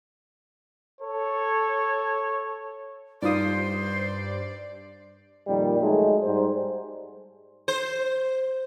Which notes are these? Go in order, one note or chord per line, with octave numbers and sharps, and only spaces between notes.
A4 C#5
G2 D#4 F4 C5 D5 D#6
F2 A#2 D#3 G3
F#3 G#3 A3 D#4
G#2 G3 C5
C5